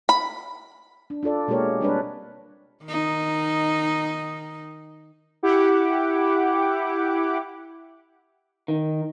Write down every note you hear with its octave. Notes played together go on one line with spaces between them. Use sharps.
B5
D4
D4 F4 A4 D5
B2 G#3 A#3 G4 A#4 C#5
G3 C4 D4 A#4 B4 C#5
D#3 D#4
E4 G4 F#5 D6
D#3